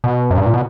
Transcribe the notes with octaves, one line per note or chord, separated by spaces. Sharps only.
B2
F#2
G2
A#2
B2